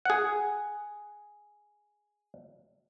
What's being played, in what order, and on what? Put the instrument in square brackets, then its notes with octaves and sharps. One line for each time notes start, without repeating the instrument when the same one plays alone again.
[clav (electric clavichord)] G#4 F#5